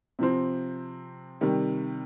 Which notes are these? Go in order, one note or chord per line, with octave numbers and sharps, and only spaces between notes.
C3 F3 C4
C3 D#3 G3